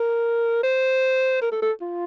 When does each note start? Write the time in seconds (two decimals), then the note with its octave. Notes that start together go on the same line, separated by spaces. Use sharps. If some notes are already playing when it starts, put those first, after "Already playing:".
Already playing: A#4
0.63 C5
1.42 A#4
1.52 A4
1.62 A4
1.81 F4